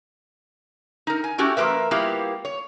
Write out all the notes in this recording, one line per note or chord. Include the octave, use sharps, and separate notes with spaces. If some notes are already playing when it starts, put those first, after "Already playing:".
D#4 A#4
G#5
A3 C#4 E4 F#4 G4
F3 A#3 A#4 B4 E5
G3 A#3 B3 E4 F4 G4
C#5